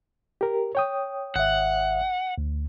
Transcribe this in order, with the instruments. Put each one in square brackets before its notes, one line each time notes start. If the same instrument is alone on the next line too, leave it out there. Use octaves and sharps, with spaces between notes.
[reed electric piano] G4 A#4
C#5 G5 D#6
[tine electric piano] G#1 E5 [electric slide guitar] F#5
[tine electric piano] D2